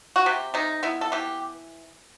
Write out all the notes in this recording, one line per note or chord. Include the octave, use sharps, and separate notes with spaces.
F#4
C3 G4
C3 D#4
B3 E4
A4
E3 G4